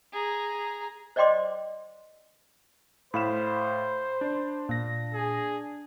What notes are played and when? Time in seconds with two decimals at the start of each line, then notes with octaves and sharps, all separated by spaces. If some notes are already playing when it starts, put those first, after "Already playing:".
0.12 G#4 A#5
1.16 C5 D5 D#5 G5 C6 D6
3.14 A2 C5 F5 B5 E7
4.21 D4
4.69 A#2 A#6
5.14 G#4